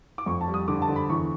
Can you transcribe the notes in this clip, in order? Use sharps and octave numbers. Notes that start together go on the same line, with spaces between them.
D6
F2 C#6
A5
G3
D#6
D3 D6
A5
D3
B5
E2 C#6